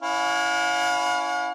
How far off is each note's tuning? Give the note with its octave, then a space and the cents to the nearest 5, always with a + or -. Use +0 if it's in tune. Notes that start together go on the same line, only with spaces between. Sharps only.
C#4 +20 E4 +0 F5 +45